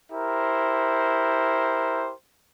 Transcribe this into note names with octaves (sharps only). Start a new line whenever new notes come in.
E4 G4 A#4 C5